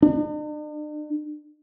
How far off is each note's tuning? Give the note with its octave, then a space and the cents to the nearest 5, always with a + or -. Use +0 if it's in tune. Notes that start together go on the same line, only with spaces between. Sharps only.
D4 +45